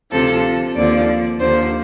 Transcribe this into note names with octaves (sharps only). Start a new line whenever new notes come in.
D2 C3 F3 A4
D#2 D3 F3 D5
D#2 D3 F3 C5